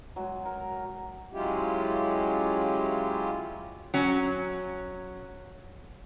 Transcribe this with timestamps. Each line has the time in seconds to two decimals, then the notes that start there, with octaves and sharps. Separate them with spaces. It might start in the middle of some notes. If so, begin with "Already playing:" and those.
0.16 F#3 G#3
0.45 A#4
1.32 F#3 G#3 C#4 E4 F4 G4
3.94 F#3 C#4